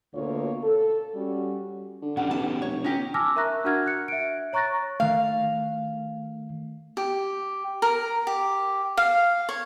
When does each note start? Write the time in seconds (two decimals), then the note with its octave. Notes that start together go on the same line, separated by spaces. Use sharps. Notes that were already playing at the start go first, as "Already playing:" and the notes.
0.14 D2 B2 D3 A#3 F4 C#5
0.64 A4
1.15 G3 C#4 F#4
2.02 D3
2.17 B2 C#4 G4 F#5
2.31 B1 A5
2.62 F1 C#5
2.84 G1 C#4 D#4 G4
3.14 G#5 A5 D6 E6 F6 A#6
3.36 A#4 E5 A#5 C#6 F#6 A#6
3.64 D4 F#4 A#4 F#5 F6 G#6
3.86 F#6 C#7
4.08 E5 D7
4.53 C#5 A#5 C#6 F#6 A6 A#6
5.00 D#3 A3 F5
6.97 G4
7.82 A#4
8.27 G4
8.97 F5
9.49 C#5